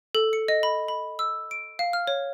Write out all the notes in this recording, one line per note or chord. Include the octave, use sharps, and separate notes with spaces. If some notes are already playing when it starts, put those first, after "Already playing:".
A4
C#7
D#5
B5
B5
E6
D7
F5
F6
C#5